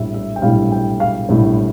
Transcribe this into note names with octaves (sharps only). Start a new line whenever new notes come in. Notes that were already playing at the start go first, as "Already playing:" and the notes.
Already playing: A#1 A2 G3 E5
E5
G5
A#1 A2 G3 F5
G5
F5
A#1 A2 G3